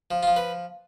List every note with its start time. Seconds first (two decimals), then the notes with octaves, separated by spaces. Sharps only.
0.11 F3
0.23 F3 F4
0.36 B4